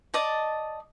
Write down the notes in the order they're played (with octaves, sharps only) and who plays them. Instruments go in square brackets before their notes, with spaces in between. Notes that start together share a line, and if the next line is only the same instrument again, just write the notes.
[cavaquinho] D5 D#5 A5